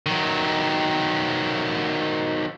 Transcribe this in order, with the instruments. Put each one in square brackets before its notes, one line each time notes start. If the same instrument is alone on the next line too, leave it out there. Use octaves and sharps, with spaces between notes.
[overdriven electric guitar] D#3 F#3